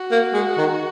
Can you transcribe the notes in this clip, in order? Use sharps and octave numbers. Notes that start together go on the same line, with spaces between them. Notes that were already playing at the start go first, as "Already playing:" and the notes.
Already playing: F#4
A#3
G#3
D#3